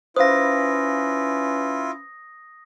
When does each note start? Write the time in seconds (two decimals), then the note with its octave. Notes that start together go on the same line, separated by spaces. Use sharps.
0.16 C#4 E4 F4 B4 C5 F5 D#6 A#6